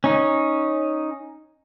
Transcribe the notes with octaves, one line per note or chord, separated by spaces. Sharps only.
C#4 D#4